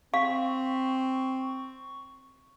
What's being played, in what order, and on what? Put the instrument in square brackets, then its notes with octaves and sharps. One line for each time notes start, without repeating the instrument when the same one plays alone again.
[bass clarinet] C4 [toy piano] F5 [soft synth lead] C#6